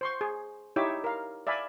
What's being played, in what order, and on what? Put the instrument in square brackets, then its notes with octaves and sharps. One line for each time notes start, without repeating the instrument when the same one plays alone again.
[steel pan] C5 C6 C#6
G#4
D#4 E4 G4 C#5 E5 D6
A#4 F5
D5 E5 F5 G#5 B5